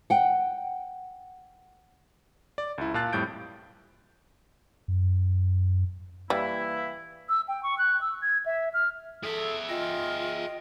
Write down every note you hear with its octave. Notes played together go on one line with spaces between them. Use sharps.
F#5 G5
D5
C#2 E4
A#2 F5 A5 F#6 A6
F2 A2 G3 G6 D7
F#2
E3 G3 A#3 E4
E6
G5
C#6
F#6
E6
G#6
E5
F6
G#4 A4 E5
F4 D#5 G5